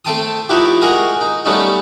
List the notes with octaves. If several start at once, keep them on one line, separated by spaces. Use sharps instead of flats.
A3 C4 G5 A5 C6 D#6
F3 D#4 E4 F#4 G4
G#3 F#4 G#4 A#4 D#6
D#4
F#3 G3 A3 B3 C#4 D#4